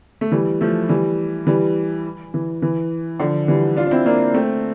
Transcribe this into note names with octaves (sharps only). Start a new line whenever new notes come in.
A3
E3 G3
F3 A3
E3 G3
E3 G3
E3
E3
D3 F3
E3 G3
D4 F4
D4
C4 E4
A#3 D4
A3 C4